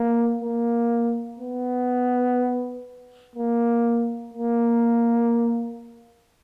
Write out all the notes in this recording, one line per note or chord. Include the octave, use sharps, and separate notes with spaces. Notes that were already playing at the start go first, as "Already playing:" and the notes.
Already playing: A#3
A#3
B3
A#3
A#3